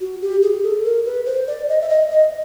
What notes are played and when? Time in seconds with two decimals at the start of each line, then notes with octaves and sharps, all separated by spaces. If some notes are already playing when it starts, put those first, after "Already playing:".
0.01 F#4
0.22 G4
0.42 G#4
0.63 A4
0.84 A#4
1.06 B4
1.26 C5
1.47 D5
1.69 D#5
1.81 E5
1.89 D#5
2.11 D#5